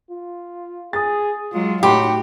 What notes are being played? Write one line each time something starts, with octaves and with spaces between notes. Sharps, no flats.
F4
G#4 D#6 A6
F#3 G#3 F4
A2 F#3 D#4 F#4 G4 G5 B5 C6